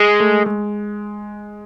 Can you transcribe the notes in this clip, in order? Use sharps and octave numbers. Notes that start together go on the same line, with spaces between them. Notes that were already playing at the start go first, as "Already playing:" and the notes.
Already playing: G#3
A3
G#3